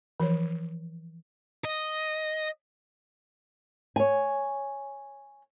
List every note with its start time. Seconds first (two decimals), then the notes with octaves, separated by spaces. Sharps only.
0.20 E3 F3 C#5
1.65 D#5
3.96 C#5 G#5